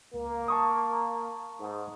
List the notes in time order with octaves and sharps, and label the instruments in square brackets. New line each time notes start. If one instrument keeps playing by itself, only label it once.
[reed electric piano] C#2 [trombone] A#3
[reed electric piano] A5 C#6 D#6
[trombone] G#2